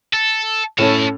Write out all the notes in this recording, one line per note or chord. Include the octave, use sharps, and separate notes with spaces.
A4
A2 C#4 A4 C#5 A5